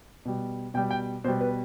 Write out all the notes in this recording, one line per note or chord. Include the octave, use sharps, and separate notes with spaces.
B2 G3
B2 G3 G5
G5
B2 G3 C5
B4